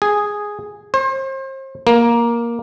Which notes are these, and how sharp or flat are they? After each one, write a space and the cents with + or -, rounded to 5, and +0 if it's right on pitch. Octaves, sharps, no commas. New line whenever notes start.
G#4 -5
C5 +35
A#3 +10